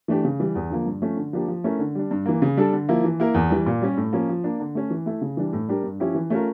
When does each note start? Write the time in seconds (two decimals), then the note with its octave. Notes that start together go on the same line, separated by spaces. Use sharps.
0.08 E3 A3 D4 G4
0.25 C#3
0.40 E3 G3
0.55 E2
0.70 D3 F3 A#3
0.86 G2
1.02 F3 A3 C#4
1.17 D3
1.33 F3 A#3 D4 G4
1.48 F3
1.64 A3 C#4 E4 A#4
1.79 D3
1.95 G3 D4
2.11 G2
2.26 E3 A#3
2.42 C#3
2.57 G3 D4 A4
2.73 D3
2.89 F3 A#3 E4
3.04 E3
3.20 A#3 E4 A#4
3.35 E2
3.50 E3 G3
3.66 A#2
3.82 G3 C#4 G4
3.97 A2
4.13 F3 A#3 C#4
4.29 F3
4.44 A#3 D4
4.60 D3
4.75 A3 C#4
4.90 E3
5.06 A3 E4
5.21 C#3
5.37 E3 G3 D4
5.53 A2
5.69 G3 D4 G4 A#4
5.83 G2
6.00 F3 C#4 E4 G4
6.15 E3
6.30 A3 C#4 F4 A#4